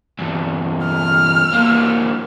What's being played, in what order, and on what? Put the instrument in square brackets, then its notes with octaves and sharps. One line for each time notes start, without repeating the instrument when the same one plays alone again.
[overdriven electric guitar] E2 G2
[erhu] F6
[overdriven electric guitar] G2 A#3